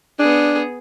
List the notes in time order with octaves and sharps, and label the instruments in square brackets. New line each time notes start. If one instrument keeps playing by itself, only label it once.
[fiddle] B3 G#4 [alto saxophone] D4